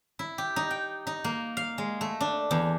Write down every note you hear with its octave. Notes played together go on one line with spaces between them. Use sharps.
E4
G4
D#4
G5
D#4
A#3
F5
G#3
A3
D4
E2